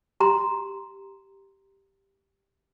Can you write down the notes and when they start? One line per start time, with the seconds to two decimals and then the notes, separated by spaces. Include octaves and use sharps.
0.20 G4 A#5 C6